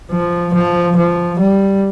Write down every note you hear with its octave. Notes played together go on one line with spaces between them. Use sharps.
F3
F3
F3
G3